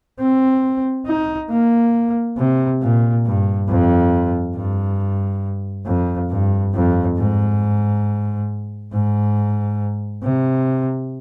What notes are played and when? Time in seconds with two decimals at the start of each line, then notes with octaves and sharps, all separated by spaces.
0.19 C4
1.06 D#4
1.50 A#3
2.37 C3
2.81 A#2
3.25 G2
3.68 F2
4.55 G2
5.86 F2
6.30 G2
6.74 F2
7.17 G#2
8.92 G#2
10.23 C3